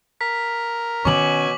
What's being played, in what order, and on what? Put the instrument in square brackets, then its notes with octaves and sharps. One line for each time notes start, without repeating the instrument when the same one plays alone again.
[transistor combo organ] A#4 [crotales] B6
[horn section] B2 C#5 G#5 [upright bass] D#3 C#4 [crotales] C#6 D6 F#7